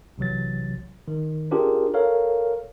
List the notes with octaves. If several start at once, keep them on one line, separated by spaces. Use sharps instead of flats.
B1 C3 E3 F#3 A6
D#3
C#4 D4 F4 G4 G#4 A#4
A4 A#4 C#5 F5